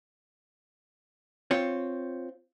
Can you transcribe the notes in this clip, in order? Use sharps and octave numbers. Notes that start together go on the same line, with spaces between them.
C4 F4 C#5